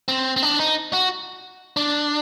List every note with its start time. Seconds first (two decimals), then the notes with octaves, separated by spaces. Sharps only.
0.08 C4
0.36 C4
0.42 D4
0.59 D#4
0.93 F#4
1.77 D4